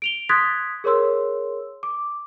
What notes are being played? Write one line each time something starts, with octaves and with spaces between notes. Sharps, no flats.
D7 F7 G7
C6 D#6 F#6 G#6 A6 B6
G#4 A#4 C#5 C6 E6
D6